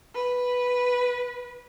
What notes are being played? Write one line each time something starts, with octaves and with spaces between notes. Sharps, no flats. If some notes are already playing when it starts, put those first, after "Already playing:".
B4